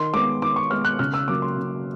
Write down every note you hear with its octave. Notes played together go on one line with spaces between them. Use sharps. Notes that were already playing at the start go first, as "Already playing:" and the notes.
Already playing: D#3 C6
G#3 B3 D6
D#3 D6
C#6
G#3 B3 F6
F#6
C#3 F6
E6
F#3 A#3 D6
C6
C#3